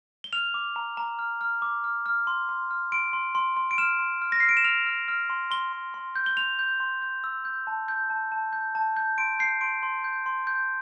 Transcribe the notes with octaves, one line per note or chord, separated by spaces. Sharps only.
G7
F6 F7
D6
A#5
A#5
F6
F6
D6
F6
F6
C6
C6
F6
C6 D7
C6
C6
C6
D7
F6 E7
C6
F6
A#6
F6 C7
D7
E7
F6 F7
F6
F6
C6
C6 G7
C6
C6
G6
G7
C6 F7
G6
C6
G6
E6
G6
A5
G6
A5
A5
G6
A5
G6
C6 D7
G6 C7
C6 D7
C6
G6
C6
G6